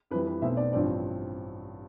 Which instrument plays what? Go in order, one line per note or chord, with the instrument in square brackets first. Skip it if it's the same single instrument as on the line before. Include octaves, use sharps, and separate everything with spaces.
[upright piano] F2 E3 G3 B4
B4
B1 B2 A3 C4 E5
D5
A1 G2 F3 C4 D5